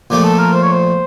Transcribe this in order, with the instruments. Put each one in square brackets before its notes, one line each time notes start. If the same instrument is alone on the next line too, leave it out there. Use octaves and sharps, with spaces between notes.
[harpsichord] A#2 F3 A3 [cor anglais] G4
[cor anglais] A4
A#4
C5
C#5
C5